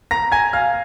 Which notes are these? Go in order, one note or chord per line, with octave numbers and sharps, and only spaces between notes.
A#5 A#6
G#5 G#6
F5 F6